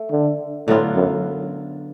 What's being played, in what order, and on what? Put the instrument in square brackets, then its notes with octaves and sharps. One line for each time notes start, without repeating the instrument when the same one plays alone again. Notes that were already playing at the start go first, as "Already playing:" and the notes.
Already playing: [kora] A3
[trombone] D3
[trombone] A2 [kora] D3 F#3 B3 F4
[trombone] F#2